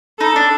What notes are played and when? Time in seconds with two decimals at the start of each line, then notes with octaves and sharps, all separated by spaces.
0.20 D#4 A4
0.36 D4